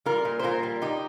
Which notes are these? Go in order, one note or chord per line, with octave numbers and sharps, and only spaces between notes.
G3 F4 A#4
A#2
C5
A#2 F4 A#4
G3
G3 D#4 G4